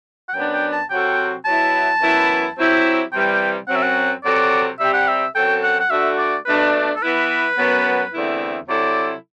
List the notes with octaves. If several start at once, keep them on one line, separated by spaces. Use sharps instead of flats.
F#5
F#2 F#3 B3 D4 G5
G5
A5
C3 F#3 C4 F#4 A4 G5
B2 F#3 B3 E4 A5
F#2 E3 B3 E4
F#3 C4 E4 G4
C3 E3 G3 G5
F#2 F#3 C4 F#5
E5
F#5
C3 F#3 C4 F#4 A4 D5
C3 G3 C4 G4 E5
F#5
E5
F#2 F#3 C4 F#4 A4 G5
F#5
F#5
D3 A3 D4 F#4 E5
D5
B2 A3 D4 B4
A4
E3 B3 E4 B4
F#2 F#3 B3
E2 D3 A3 C4 E4
C3 F#3 C4 E4 A4 D5